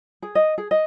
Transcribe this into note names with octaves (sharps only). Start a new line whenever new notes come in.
G#4
D#5
G#4
D#5